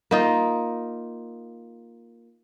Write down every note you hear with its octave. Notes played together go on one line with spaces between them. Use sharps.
A#3 D#4 F4